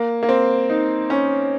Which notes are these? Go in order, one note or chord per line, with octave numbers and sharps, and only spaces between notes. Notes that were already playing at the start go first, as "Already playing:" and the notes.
Already playing: A#3
A#3
C4
D#4
C#4